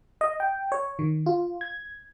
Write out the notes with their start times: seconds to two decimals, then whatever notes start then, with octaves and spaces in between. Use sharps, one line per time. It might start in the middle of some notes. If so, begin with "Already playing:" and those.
0.21 D#5
0.40 G5
0.72 C#5
0.99 D#3
1.26 F4
1.61 G#6